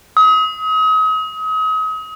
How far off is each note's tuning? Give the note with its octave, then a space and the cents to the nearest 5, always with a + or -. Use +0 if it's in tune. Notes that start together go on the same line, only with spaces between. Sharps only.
D#6 +35